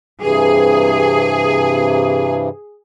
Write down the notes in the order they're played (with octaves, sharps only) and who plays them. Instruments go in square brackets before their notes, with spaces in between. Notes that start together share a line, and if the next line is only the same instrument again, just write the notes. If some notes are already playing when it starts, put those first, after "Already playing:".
[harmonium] G2 C3 E3 [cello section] G#4